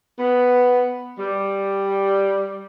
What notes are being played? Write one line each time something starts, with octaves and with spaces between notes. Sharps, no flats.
B3
G3